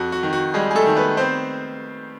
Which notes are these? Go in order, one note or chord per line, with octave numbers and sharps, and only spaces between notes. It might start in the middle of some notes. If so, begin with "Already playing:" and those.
Already playing: F2 F#4
F#4
D#3
F#4
G3 G#3 G#4
G#4
A3 A4
D#3
B3 B4
B3 C4 C5